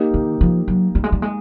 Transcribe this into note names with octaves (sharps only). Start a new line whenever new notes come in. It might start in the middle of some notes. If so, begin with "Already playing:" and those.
Already playing: A#3 D#4 G4
D#3
F3
F#3
G3
G#3
G3
G#3